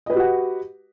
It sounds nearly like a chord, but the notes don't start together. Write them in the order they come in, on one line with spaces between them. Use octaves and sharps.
D#5 B4 G4 F#4 F#5